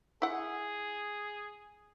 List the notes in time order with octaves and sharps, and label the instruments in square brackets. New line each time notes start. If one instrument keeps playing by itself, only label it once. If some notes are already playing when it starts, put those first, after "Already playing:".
[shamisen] E4 F#5 [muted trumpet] G#4